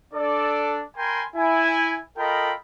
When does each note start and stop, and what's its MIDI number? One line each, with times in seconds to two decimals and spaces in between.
0.14 0.82 62
0.14 0.82 69
0.14 0.82 74
0.97 1.23 70
0.97 1.23 79
0.97 1.23 80
0.97 1.23 83
0.97 1.23 84
1.36 2.00 64
1.36 2.00 80
2.18 2.54 65
2.18 2.54 69
2.18 2.54 70
2.18 2.54 75
2.18 2.54 79
2.18 2.54 83